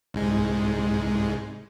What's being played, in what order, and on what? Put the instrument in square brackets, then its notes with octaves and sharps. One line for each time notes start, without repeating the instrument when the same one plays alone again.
[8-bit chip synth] C2 G#2 G#3